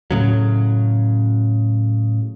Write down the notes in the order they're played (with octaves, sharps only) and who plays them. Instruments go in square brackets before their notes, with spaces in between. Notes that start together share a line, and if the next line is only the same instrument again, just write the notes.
[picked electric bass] A2 C#3 F#3